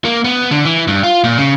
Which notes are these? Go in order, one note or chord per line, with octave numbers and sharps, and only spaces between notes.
A#3
B3
D3
E3
G2
F4
A#2
C#3